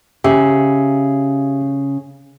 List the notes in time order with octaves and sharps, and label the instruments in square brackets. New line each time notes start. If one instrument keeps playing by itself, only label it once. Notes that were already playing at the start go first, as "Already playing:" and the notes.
[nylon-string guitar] C#3 [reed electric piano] G4 E5